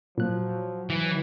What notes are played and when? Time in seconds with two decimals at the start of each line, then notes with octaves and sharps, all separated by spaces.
0.18 A#2 F3 F#3 F#6
0.90 E3